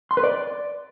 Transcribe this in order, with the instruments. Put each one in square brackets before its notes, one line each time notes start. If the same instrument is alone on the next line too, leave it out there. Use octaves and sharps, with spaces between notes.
[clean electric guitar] C6
B4
D5